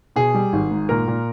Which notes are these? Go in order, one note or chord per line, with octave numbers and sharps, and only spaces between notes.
B2 G#4
G3
G#1
G#2
A#2 A#4
A#2